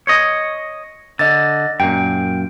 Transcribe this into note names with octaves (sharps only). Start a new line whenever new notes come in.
C#5 D#5
D3 D#5 A6
F#2 A#2 G5